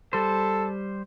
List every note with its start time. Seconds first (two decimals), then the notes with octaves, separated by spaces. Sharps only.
0.13 G3 A4 C5